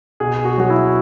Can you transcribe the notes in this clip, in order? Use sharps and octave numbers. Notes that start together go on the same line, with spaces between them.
B2 G#4
F#4
F#3 F#4
E4